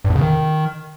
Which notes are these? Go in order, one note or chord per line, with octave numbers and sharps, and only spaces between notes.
G2
E2
C#3
D#3